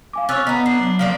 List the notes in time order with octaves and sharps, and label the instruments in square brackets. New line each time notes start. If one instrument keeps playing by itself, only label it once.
[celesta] F5 G#5 D6
[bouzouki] C#4 C#5 [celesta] E6 F#6 A6
[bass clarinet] B3 [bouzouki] D#4 B4 [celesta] A#5 B6
[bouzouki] D4 [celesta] C7
[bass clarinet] F#3
[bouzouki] F3 A#3 D5 [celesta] F5